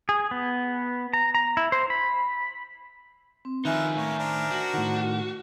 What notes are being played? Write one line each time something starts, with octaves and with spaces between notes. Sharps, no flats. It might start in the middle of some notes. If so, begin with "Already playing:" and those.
G#4
B3
A#5
A#5
E4
C5
B5
C4
D#3 F3 D#4 E4 A#4 B4 E5 G#5
A2 A#3 C#4 A#4
D4 A#4 C5
F#4
A2 D#3 F#5